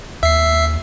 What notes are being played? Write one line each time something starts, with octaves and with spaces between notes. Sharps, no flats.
D#2 E5 C7